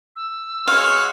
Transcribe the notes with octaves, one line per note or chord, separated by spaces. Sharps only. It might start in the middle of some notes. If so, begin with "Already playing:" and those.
E6
G#3 F#4 C#5 F5